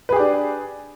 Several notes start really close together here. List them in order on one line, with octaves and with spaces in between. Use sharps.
B4 G#4 G4 D4